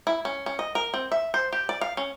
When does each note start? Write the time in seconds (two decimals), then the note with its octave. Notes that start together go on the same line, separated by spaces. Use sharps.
0.07 E4
0.25 C#4
0.46 C#4
0.59 D#5
0.75 A#4
0.94 C4
1.12 E5
1.34 C5
1.53 G4
1.69 D5
1.81 F5
1.97 C#4